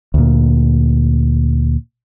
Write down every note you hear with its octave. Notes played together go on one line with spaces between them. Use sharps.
D2 A#2